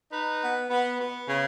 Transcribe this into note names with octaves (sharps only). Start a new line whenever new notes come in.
D#4 B4
B3
B3
B3
C#3